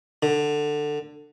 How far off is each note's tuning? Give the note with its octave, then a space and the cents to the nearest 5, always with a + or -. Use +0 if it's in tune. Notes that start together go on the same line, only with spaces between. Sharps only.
D3 +15